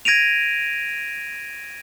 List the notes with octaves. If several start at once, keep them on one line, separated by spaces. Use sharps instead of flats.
G#6 A#6 D7 D#7 F7